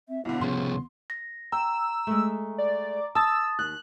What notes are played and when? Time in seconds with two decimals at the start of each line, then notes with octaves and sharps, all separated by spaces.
0.09 C4 E5
0.25 B1 D3 B3 E4
0.41 C2 C#3 F3 C6
1.10 A#6
1.52 G5 A#5 E6
2.07 G#3 A3
2.58 D5
3.15 A5 D#6 E6 A6
3.59 D#2 F#6